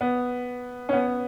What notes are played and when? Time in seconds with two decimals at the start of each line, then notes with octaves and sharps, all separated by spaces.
0.01 B3
0.89 C#4
0.93 B3